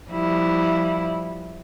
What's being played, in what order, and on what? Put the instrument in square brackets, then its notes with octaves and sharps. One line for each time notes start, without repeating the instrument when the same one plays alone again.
[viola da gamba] F3 G3 E4